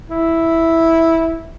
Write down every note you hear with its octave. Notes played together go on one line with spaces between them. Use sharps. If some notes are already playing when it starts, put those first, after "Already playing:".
E4